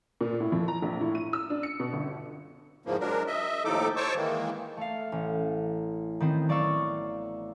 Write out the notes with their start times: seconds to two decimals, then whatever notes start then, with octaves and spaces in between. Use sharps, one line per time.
0.21 A#2
0.40 A2
0.52 F2
0.68 A#5
0.82 A#1
1.01 A2
1.15 D#7
1.33 E6
1.50 D4
1.63 C#7
1.80 B2
1.93 G1
2.86 E2 G#2 C#3 F3 A#3
3.00 F#3 G#3 D4 A#4
3.27 D#5 E5
3.65 D#2 A2 F3 D#4 A4 D6
3.96 C5 C#5 A5 C#6 D6 E6
4.16 D#3 E3 G#3 A#3
4.77 A3 F5
5.12 A1
6.20 D#3 B3 C4
6.49 F#3 D5 F5 C#6 E6